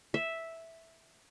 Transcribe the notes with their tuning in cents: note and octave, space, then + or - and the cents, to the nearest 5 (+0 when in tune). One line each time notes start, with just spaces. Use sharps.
E5 -5